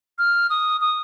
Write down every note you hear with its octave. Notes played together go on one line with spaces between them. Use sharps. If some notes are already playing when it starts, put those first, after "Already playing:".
F6
D#6
D#6